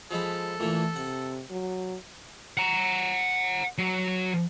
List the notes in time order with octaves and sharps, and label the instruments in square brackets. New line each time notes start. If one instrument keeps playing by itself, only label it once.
[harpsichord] F3 G#3 B5 [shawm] A4
[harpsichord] A#2 E3 [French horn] A3
[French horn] C3 [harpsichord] F#5
[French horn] F#3
[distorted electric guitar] F#5 A#5
F#3